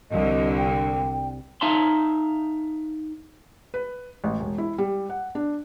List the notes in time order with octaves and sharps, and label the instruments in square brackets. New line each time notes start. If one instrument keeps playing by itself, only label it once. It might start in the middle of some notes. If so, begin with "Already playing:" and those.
[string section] C2 D3 [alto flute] D#5
[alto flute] G5
[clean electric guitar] D#4 E5 F5 A5 C6
[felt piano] B4
A1
E1
E4
G3
F#5
D4